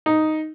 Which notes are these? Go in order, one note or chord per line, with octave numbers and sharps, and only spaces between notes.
D#4